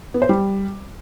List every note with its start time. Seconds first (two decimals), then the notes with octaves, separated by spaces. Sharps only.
0.14 B3
0.22 C5
0.29 G3